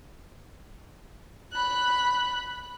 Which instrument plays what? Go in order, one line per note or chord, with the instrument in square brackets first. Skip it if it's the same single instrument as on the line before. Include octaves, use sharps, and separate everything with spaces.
[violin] B5 F#6